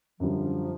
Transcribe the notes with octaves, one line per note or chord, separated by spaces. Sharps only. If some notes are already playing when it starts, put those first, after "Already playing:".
F#2 D3 F3 G3